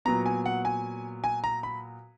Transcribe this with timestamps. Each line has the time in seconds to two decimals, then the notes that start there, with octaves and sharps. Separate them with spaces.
0.05 A#2 F#3 B3 A#5
0.26 G#5
0.46 F#5
0.65 G#5
1.24 G#5
1.44 A#5
1.63 B5